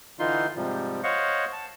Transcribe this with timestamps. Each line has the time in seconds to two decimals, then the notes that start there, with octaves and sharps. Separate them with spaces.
0.19 D3 E3 D#4 F4 C6
0.56 G#2 C3 F3 G3
1.03 C5 C#5 D#5 F5 F#5 C#6
1.53 A5